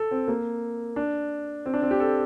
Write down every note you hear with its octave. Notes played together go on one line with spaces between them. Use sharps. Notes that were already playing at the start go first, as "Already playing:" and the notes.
Already playing: A4
C4
A#3
D4
C4
D4
C4
G4
A4